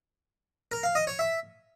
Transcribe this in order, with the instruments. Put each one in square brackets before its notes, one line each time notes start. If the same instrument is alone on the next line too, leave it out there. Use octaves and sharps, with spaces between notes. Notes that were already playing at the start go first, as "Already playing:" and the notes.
[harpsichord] A#4
F5
D#5
C#5
E5